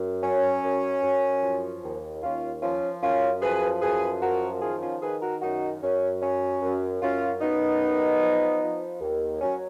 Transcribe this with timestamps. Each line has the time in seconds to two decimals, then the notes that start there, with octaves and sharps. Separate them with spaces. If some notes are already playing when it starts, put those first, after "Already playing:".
Already playing: F#2
0.23 F#3 C#4
0.64 F#2
1.03 F#2
1.43 F3
1.83 D#2
2.23 D#2 C#4 F4
2.63 F3 C#4 F4
3.03 F#2 C#4 F4
3.42 F3 G#4 B4
3.82 F#2 G#4 B4
4.22 F3 F#4 A#4
4.62 D#3 F4 G#4
4.82 C#4 F4
5.02 D#3 G#4 B4
5.22 F#4 A#4
5.42 F#2 D#4 F#4
5.82 F#2 C#4
6.22 F#3 C#4
6.62 F#2
7.02 F#2 C#4 F4
7.41 F#2 B3 D#4
7.81 D#2
8.21 F3
8.62 F3
9.01 D#2
9.41 F#3 C#4